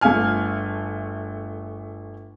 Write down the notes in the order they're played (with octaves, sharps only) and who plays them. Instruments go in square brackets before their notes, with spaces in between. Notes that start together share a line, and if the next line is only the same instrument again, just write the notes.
[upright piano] G1 A3 G#4 F5 G#5 F6